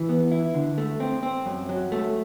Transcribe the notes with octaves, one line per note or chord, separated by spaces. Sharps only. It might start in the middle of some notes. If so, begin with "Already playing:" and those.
Already playing: E3
B3
E4
D3
A3
C4
C4
F#2
F#3
A3